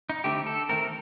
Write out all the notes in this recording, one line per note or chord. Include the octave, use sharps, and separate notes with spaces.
D#4
D3 A3 C4 G4
A4
D#3 A3 C4 A#4